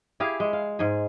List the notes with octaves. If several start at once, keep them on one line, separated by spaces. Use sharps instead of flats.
E4 G4 G#4 F5
G#3
F5
G#2 G#4